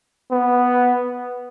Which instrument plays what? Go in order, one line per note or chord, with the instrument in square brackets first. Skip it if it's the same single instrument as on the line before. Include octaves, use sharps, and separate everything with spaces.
[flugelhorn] B3